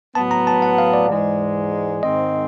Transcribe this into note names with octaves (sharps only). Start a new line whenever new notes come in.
A2 F#3 B3 A5
A#5
A5
F#5
F5
D5
G#2 E3 G#3
G#2 D#3 G#3 C4 D#5